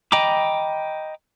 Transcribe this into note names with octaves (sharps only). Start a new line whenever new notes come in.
D#5 G5 A#5 B5 D6